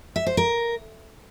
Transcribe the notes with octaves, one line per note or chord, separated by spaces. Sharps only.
E5
C5
A#4